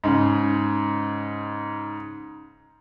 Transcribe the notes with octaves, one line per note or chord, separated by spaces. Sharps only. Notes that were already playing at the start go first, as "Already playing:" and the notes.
G#2 C#3